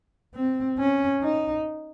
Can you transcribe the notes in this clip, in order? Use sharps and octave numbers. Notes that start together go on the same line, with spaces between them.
C4
C#4
D#4